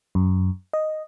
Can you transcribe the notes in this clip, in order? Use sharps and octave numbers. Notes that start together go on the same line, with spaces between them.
F#2
D#5